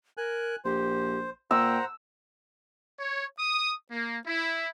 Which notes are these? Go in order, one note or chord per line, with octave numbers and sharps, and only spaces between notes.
A#4 G#5 F#6
A#1 G4 C5
A#2 C5 F#5 G5 A#5 E6
C#5
D#6
A#3
E4